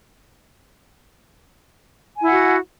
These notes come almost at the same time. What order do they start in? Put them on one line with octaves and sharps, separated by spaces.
G#5 E4 F#5 F#4